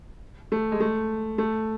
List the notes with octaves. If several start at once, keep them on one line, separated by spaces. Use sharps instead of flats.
A3
G#3
A3
A3